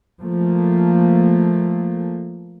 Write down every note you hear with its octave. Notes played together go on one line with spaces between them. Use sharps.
F3 A3 A#3